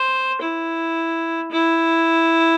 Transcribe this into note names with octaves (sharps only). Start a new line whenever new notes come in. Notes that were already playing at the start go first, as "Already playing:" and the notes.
Already playing: C5
E4
E4